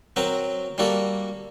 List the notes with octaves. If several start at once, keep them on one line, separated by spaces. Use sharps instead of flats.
F#3 C4 F#4 A#4
G3 A#3 F#4 A4